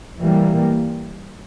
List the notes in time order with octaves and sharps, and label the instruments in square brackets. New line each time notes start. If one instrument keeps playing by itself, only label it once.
[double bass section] E3 G3 A#3